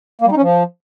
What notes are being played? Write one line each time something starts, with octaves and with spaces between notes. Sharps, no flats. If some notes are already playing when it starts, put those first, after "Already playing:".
A#3
G3
D#4
C#4
F3